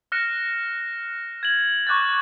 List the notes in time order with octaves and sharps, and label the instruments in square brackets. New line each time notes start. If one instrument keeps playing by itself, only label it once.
[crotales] F6 F#6 A#6 C#7 E7
G#6 F#7
C#6 D6 F#6 G6 A6